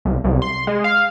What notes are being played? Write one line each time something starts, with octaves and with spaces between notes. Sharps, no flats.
C2
C2
C6
G#3
F5